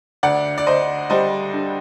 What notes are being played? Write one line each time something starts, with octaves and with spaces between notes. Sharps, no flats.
D2 D5 F#5
D5
D2 C5 D#5
G3 C5 D#5
D3